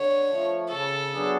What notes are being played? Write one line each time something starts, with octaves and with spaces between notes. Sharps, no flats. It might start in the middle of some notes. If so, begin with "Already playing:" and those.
Already playing: D3 C#5
F3 A3
C#3 A4
F#3 B3 D4 G#4